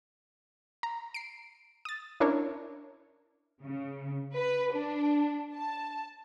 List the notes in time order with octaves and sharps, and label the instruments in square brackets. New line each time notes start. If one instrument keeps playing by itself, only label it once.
[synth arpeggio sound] A#5
C7 D7
D#6 A6
C#4 D4 E4 A#4 C#5
[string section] C#3
B4
D4
A5